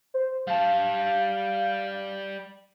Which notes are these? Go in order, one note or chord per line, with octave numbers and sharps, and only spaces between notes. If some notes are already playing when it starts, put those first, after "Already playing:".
C5
G3 F5 A5